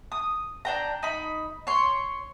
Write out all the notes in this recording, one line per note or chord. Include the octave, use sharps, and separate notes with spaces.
D#6
D4 G5 A#5
D#4 B5
C#5 C6